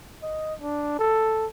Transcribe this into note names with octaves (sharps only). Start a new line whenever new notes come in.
D#5
D4
A4